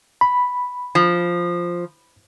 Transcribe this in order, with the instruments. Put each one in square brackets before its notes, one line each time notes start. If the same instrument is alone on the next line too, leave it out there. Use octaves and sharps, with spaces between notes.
[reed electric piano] B5
[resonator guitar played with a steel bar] F3